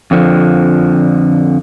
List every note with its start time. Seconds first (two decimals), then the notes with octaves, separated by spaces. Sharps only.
0.11 F2 D3 F3